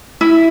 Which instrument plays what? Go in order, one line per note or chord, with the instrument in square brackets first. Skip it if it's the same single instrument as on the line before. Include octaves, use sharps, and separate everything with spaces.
[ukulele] E4